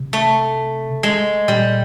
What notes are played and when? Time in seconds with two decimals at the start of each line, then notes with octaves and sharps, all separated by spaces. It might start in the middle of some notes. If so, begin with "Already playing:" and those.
Already playing: C3
0.13 A3
1.03 G#3
1.48 A#2 G3